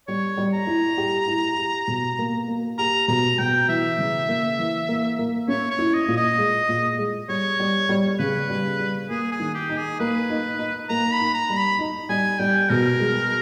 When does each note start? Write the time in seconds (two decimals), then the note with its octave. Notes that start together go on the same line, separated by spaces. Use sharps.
0.08 G3 C#5
0.37 G3
0.53 A#5
0.67 E4
0.98 G4
1.28 E4
1.58 G4
1.88 B2
2.19 A#3
2.48 A#3
2.78 G4 A#5
3.08 B2 A#5
3.38 B2 G5
3.68 E3 E5
3.98 C#3
4.28 A#3
4.59 E3
4.88 A#3
5.18 A#3
5.48 C#4 C#5
5.71 C#5
5.79 E4
5.94 D#5
6.08 A#2
6.17 D#5
6.38 G#3
6.69 A#2
6.98 G#3
7.29 G3 C#5
7.59 G3
7.89 G3
8.19 C#3 B4
8.50 G3
8.79 G3
9.09 A#3 G#4
9.32 G#4
9.40 D#3
9.54 G4
9.69 D#4
9.77 G#4
9.99 A#3 B4
10.30 D#4
10.59 D#4
10.89 A#3 A#5
11.13 B5
11.20 D#4
11.34 A#5
11.50 G3
11.57 B5
11.79 D#4
12.09 G3 G#5
12.39 G3 G5
12.70 B2 A#4
13.00 G#3